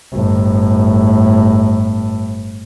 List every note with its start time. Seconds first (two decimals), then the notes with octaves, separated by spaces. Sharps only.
0.13 G1 A2